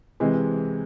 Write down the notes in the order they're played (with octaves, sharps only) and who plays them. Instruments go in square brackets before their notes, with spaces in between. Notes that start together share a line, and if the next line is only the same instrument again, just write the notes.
[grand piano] C3 E3 G#3